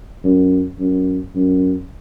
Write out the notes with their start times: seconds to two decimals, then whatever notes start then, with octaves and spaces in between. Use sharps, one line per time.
0.24 F#2
0.79 F#2
1.35 F#2